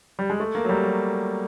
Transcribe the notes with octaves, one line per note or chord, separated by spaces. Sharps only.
G3
G#3
A3
A#3
F#3
G3
F#3